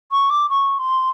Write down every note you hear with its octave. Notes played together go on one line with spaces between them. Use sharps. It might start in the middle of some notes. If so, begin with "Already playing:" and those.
C#6
D6
C#6
C6